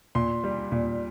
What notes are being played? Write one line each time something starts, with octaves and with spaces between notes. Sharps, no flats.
A#2 C6
G3
A#2